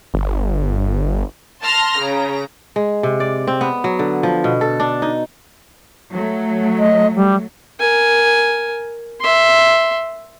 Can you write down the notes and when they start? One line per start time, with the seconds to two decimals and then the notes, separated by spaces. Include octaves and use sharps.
0.14 G1
1.62 A5 C6 F6 A#6
1.98 C#3 A#5
2.76 G#3
3.03 C3
3.20 D5
3.47 C4
3.61 B3
3.84 F#3
3.99 D3
4.23 F3
4.44 B2
4.61 A4
4.80 D4
5.02 D#4
6.12 F#3 A3
6.79 D#5
7.16 G3
7.80 A#4 G#5
9.20 E5 C6